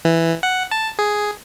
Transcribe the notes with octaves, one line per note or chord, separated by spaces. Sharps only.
E3
F#5
A5
G#4